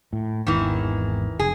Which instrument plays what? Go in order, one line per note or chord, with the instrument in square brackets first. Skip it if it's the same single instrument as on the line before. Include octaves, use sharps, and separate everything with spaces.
[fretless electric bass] A2
[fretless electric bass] G#1 E2 G#2 [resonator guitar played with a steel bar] D#3 E3
[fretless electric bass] F1 [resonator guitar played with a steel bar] G#4